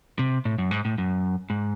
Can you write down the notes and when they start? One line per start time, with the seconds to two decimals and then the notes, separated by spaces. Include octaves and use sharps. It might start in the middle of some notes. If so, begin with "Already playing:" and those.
0.19 C3
0.45 A2
0.58 F#2
0.71 G#2
0.85 A2
0.98 F#2
1.50 G#2